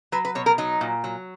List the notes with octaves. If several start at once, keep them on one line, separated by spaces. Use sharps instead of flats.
F#3 B4
B4
B2 C#5
A#4
F#3 D#4
A#2
F#3